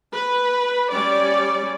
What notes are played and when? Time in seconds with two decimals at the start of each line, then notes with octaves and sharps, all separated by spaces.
0.13 B4
0.93 G3 C#4 D5